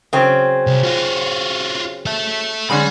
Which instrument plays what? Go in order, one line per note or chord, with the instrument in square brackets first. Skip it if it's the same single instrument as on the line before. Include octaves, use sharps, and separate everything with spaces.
[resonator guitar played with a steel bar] C#3 F#3 C4
[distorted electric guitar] C2
F4 F#4
A4 E5
[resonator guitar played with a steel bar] D3 G#3 C#4 [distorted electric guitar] D5 B5